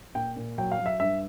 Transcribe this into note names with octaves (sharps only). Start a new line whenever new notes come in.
A#2 G5
A#2
F#3 G5
F5
F#3
E5
G2 E5